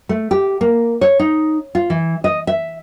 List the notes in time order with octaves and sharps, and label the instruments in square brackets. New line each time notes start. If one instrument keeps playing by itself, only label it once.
[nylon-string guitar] A3
G4
A#3
C#5
D#4
F4
E3
D#5
E5